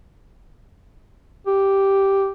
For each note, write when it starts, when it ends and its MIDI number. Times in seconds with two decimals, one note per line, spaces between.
1.47 2.31 67